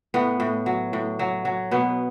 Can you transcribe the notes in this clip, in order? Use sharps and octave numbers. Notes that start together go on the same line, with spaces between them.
A2 B3
A2
F#3
A2
F#3
F#3
B2 B3